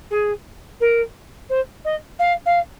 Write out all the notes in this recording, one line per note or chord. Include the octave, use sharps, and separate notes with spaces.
G#4
A#4
C5
D#5
F5
F5